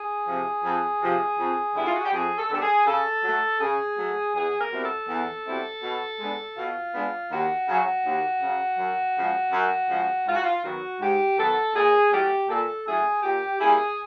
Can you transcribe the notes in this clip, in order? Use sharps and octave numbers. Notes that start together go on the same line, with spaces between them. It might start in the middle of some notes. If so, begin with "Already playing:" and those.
Already playing: G#4
C3 F3
F2
C3 F3
F2
D3 G3 B3 D4 E4
F4
F#4
G4
F2 G#4
A4
D3 G3 B3 D4 A4
G#4
C#3 A4
F#3 A3
C#3 G#4
F#3 A3
E2 G#4
A#4
B2 G3 C4 E4
A4
E2
B2 G3 C4 E4
B2
G#3 B3 D4
B2 F4
G#3 B3 D4
D#2 F#4
C#3 F#3
D#2
C#3 F#3
F#2
C#3 F3 G#3
F#2
C#3 F3 G#3
G#2 F4
F#4
F4
D#3 F#3 B3 F#4
G#2 G4
D#3 F#3 B3 A4
A#2 G#4
F#3 A3 C#4 E4 G4
A#2 A4
F#3 A3 C#4 E4 G#4
A#2 G4
G3 A#3 C#4 E4 G#4